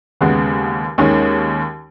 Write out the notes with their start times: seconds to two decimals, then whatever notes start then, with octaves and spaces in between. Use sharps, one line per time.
0.21 D#2 C#3 G#3 B3
0.98 D#2 D#3 G#3 C#4